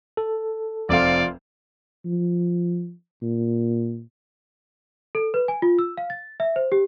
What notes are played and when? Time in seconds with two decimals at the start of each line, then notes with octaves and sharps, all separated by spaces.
0.17 A4
0.89 F1 C4 F4 D5 F5
2.05 F3
3.22 A#2
5.15 A4
5.34 B4
5.48 G#5
5.62 F4
5.79 E6
5.97 F5
6.10 A6
6.40 E5
6.56 C5
6.72 G4